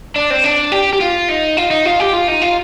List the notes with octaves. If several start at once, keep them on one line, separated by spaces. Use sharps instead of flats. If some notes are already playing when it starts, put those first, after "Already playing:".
D4
C4
D4
G4
G4
F4
D#4
F4
D#4
F4
G4
F4
D#4
F4